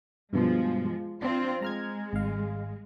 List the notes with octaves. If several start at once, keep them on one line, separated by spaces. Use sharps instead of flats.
G2 B2 F3 G#3
C4 D4 F4
G#3 A#5 F6 G#6
G#1 F5